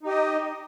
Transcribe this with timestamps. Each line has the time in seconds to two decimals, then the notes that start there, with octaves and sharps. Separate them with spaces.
0.03 D#4
0.06 G4
0.09 D#5